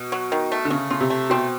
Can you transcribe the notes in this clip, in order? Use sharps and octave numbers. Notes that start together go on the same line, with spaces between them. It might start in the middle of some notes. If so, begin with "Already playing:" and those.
Already playing: B2
F#3
D#3
A3
D3
C#3 A3
C#3 F4
C3
A3
B2 C4